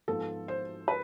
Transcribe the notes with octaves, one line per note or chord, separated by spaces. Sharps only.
G#2 F3 B3 A4
C5
B4